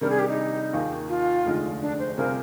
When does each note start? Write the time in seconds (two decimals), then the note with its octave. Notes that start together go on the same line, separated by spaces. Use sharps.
0.01 C3 D#3 G3 D4 A#4
0.10 G#4
0.19 G4
0.28 D#4
0.73 D#2 D#3 A#3 F4 G#4
1.09 F4
1.45 F1 D#2 D3 G#3 D#4
1.81 D4
1.99 C5
2.17 C3 G3 C4 F4 G#4 A#4